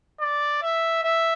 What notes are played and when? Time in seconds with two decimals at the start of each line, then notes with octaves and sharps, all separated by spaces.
0.20 D5
0.62 E5
1.03 E5